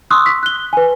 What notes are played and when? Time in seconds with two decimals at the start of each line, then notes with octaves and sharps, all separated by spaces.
0.11 C6 C#6 D#6 E6 F#6
0.26 B6
0.43 F#6 G7
0.73 B4 G#5